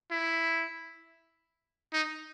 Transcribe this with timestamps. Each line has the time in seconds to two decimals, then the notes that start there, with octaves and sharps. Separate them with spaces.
0.12 E4
1.93 D#4